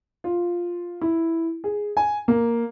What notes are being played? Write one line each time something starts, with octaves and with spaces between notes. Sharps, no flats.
F4
E4
G#4
G#5
A#3